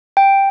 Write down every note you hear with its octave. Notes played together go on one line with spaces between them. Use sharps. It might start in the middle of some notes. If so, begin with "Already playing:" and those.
G5